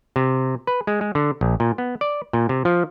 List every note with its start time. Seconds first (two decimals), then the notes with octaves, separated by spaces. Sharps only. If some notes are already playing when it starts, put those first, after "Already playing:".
0.16 C3
0.67 B4
0.87 G#3
1.01 G#3
1.15 D3
1.41 A#1
1.60 A#2
1.78 B3
2.01 D5
2.33 A#2
2.49 C3
2.65 F3